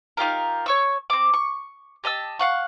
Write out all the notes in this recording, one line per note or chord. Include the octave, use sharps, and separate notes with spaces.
D#4 F4 G4 A#4
C#5 C#6 E6
C4 D6
C#6
G4 D#5 A5 E6
F5 F#5 C#6